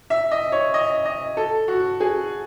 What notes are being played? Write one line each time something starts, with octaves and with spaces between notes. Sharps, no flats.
E5
D#5
C#5
D#5
D#5
A4
F#4
G#4